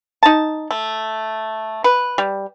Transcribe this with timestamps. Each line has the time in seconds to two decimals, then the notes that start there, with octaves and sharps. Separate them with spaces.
0.23 D#4 A5
0.71 A3
1.84 B4
2.18 G3